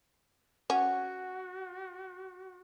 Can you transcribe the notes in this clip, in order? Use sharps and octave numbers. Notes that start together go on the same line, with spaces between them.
C#4 F#4 F#5